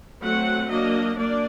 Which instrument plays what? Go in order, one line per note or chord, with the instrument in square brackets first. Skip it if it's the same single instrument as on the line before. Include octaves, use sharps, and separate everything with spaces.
[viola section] F#3 A3 C4 F#5
F#3 A#3 D4 D#5
A#3 D4 D5